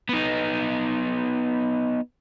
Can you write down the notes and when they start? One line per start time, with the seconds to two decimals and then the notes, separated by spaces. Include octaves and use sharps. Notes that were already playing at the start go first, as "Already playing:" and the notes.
0.09 B3 D#4